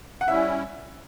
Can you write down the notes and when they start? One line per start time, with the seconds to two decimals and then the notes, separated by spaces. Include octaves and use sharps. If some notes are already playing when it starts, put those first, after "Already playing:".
0.21 F#5
0.28 G3 C#4 E4 E5